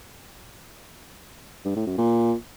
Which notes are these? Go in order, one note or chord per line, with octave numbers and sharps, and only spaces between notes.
G2
A2
F#2
A#2